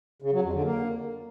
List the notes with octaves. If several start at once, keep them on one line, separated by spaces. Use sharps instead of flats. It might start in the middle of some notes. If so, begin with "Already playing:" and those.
C#3
F#3
F2
D3
A#3